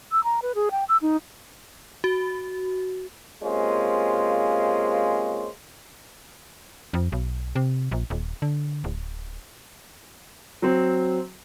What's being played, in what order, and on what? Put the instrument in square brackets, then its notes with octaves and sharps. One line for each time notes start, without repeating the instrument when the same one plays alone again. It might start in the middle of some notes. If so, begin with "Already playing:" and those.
[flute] E6
A#5
B4
G#4
G5
E6
D#4
[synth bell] F#4
[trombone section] C3 G#3 A#3 C#4 F4 C5
[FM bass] F2
B1
C3
A#1
D#1
D3
D1
[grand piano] F#3 C4